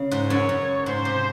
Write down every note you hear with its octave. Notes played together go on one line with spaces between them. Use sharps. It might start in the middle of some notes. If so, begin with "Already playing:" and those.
Already playing: C#3
G#2
F#2 C#5
F#2
G#2 C5
C3